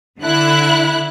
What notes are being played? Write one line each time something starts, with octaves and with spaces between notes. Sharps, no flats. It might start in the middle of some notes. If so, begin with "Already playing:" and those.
D3 E4 F#6